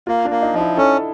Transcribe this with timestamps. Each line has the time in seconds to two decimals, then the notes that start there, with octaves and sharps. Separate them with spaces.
0.07 A#3 F4
0.25 D4
0.30 A#3
0.42 D#4
0.54 F3 D#4
0.60 E4
0.77 C#4 A4